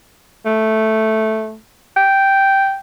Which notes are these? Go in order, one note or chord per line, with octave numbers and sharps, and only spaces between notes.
A3
G5